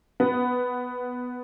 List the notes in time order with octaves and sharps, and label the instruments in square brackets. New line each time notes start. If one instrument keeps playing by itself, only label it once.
[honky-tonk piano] B3